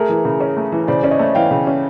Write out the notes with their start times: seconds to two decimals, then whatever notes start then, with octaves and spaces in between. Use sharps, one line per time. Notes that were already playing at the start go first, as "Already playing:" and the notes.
Already playing: A3 G#4 A#4
0.09 E3
0.25 C#3
0.41 C#4
0.57 A3
0.72 E3
0.87 C#3 C5 D5
1.03 C#4 D5
1.11 C#5 D#5
1.19 A3
1.35 E3 F5 G5
1.51 C#3
1.67 C#4